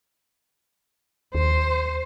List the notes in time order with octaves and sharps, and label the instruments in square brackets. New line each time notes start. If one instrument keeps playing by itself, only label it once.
[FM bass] D#2 [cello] C5